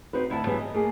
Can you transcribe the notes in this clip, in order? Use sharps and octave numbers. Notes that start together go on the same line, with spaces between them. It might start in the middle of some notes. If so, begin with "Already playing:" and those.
C4 D#4 F#4 B4
D2 E4 F#5 G5 A5
C#3 E3 F#3 G#3 B3 G4
D#5
A3 A#3 G#4